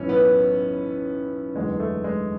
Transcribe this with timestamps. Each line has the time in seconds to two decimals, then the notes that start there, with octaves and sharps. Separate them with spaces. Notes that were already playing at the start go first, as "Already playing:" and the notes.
Already playing: B1 A2 E3 C#4
0.09 B3
1.55 F#1 E2 D3 G#3
1.80 A3
2.04 G#3